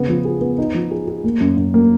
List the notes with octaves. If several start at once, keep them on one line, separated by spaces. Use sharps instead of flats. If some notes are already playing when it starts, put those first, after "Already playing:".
Already playing: C#3 B3
F3
G#4
B3
D#4
F3
G#4
G#4
A#3
F#2
F#2
A#3